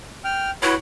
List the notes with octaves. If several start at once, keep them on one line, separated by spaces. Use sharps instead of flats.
G5 F6
E4 F#4 B4 C#5